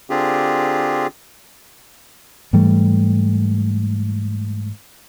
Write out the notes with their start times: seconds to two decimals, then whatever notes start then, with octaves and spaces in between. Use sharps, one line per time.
0.10 D3 C4 D4 F4 G4 G#4
2.53 G#2 E3 G3 A3